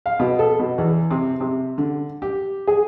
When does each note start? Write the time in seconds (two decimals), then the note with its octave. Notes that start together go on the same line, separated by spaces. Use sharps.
0.06 F5
0.19 B2
0.39 A4
0.59 B2
0.78 E2
1.11 C3
1.40 C3
1.78 D3
2.22 G4
2.67 G#4